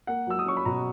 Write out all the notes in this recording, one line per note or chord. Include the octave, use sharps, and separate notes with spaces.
A#3 F#5
F#3 E6
D#6
C#4 C#6
B5
B2 A#5